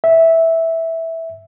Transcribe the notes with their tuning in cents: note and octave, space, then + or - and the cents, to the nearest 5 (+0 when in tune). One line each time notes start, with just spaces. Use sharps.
E5 -10